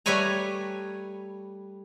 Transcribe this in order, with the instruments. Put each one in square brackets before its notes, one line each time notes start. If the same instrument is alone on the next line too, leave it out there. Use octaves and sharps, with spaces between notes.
[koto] G3 A3 B4 C#5 G#5 A#5